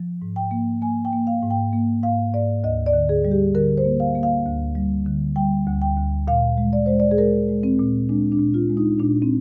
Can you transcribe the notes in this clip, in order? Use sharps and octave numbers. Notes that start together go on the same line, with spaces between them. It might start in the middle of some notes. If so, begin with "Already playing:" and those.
Already playing: F3
G#2
G5
A#3
A#3 G#5
G5
A#3
F5
G#2
G5
A#3
G#2 F5
G#2 D5
D2 D#5
D5
D3
G#4
G3
G4
D3 A#4
C5
A#3
F5
A#3
F5
D2
G3
D3
G3 G5
D2
G5
D2
A#2 F5
G#3
D5
G#3 C5
D5
G#4
G#3 A#4
G#3
C4
A#2
G#3 D4
D4
A#2
F4
G#3
D#4
A#2 D4
C4